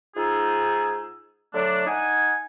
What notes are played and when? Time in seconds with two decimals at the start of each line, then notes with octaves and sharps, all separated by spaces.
0.16 G#2 D#4 F4 G#4 E6
1.54 D3 F#3 A3 D4
1.87 D#4 F#5 G#5